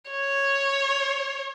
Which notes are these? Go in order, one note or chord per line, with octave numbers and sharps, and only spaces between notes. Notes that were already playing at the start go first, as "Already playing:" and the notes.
C#5